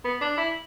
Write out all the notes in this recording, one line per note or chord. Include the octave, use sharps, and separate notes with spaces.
B3
D4
E4